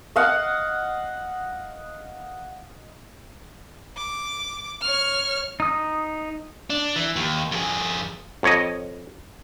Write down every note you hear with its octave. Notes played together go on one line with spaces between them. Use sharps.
D#5 F5 F#5
D6
C#5 F6
D#4 D#6
D4
E3
D#2
F2 G#4
F2 C#5 D#5